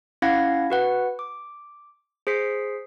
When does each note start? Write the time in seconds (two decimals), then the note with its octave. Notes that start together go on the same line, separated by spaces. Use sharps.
0.22 C#4 E4 F5 F#5 G#6 A#6
0.70 F#4 B4 F#5
1.19 D6
2.27 G#4 C5 B6 C7